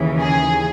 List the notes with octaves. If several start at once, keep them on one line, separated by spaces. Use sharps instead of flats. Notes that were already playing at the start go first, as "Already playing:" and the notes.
Already playing: D#2 C#3 E3
G#4